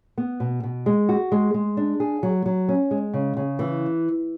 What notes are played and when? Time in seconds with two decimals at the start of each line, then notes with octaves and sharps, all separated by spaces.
0.18 B3
0.40 B2
0.63 B2
0.86 G#3
1.09 F#4
1.32 G#3
1.54 G#3
1.77 D4
2.00 G#4
2.23 F#3
2.46 F#3
2.69 C#4
2.91 G#3
3.14 C#3
3.37 C#3
3.59 E3